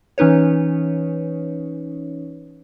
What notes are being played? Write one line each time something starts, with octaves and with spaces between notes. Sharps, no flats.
E3 C#4 D#4 B4 C#5